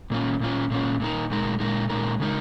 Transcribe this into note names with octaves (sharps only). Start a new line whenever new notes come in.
A#2 A#3 C#4 F4
A#2 A#3 C#4 F4
A#2 A#3 C#4 F4
A#2 G#3 D#4 A#4
A#2 G#3 D#4 A#4
A#2 G#3 D#4 A#4
A#2 G#3 D#4 A#4
C#3 G#3 D#4 A#4